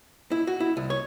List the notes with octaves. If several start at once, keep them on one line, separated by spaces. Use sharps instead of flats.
E4
F#4
E4
C2
C#5